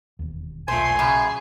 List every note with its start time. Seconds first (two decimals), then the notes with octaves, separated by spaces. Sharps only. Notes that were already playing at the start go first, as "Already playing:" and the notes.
0.19 E1 D#2
0.68 B1 A#2 A3 C5 G#5 C6
0.99 F#2 C#3 G#4